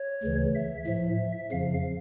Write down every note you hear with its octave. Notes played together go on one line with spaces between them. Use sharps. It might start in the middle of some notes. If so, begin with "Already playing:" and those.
Already playing: C#5
D2 C#3 E3
E5
A2 F3 E5
F2 C#3 F3 F5